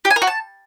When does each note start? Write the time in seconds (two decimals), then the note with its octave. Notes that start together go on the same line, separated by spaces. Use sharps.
0.05 G4
0.10 G#5
0.16 A#4
0.22 F#4
0.27 A5